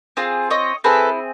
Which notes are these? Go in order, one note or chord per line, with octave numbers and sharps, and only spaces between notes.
C4 F4 G#4
C#5 D#5
C4 E4 G#4 A4 B4